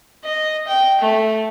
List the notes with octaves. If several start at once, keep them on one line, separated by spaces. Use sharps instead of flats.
D#5
G5
A3